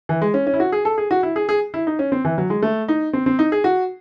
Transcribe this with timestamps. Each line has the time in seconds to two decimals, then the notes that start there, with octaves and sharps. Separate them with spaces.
0.09 E3
0.22 G#3
0.34 C#4
0.47 C#4
0.54 E4
0.60 F#4
0.72 G#4
0.85 A4
0.98 G#4
1.11 F#4
1.23 E4
1.36 G#4
1.49 G#4
1.74 E4
1.87 D#4
1.99 C#4
2.12 C4
2.25 E3
2.38 F#3
2.50 G#3
2.62 A3
2.88 D#4
3.13 C4
3.26 C4
3.39 D#4
3.52 G#4
3.64 F#4